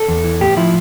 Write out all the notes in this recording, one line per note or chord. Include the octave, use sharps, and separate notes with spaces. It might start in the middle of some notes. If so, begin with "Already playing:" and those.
Already playing: A4
E2
E3
A2 G4
F3 E4